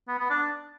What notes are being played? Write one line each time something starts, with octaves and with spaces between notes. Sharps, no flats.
B3
B3
D4